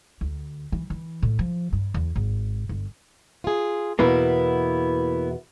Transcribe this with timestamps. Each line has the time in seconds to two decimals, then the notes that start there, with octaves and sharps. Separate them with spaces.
0.21 D2
0.72 E3
0.90 E3
1.22 A2
1.39 F3
1.73 G2
1.94 E2
2.16 G#1
2.69 G1
3.44 F4 G#4
3.99 E2 B2 A#3 B3 E4